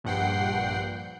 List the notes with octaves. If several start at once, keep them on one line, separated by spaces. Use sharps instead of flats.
A#1 G2 F#5 G5 C7